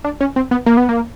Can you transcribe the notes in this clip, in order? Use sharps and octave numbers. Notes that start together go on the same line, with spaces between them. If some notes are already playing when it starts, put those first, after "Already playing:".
D4
C#4
C4
B3
A#3
B3
A#3